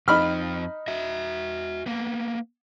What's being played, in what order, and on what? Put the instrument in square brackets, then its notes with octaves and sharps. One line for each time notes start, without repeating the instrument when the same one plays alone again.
[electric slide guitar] F2 C4 [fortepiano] D#4 B5 F6
[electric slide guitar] F#4 E5
A#3 B3